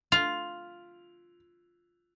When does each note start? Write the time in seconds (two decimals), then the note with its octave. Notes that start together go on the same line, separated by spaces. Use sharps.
0.12 F4 F7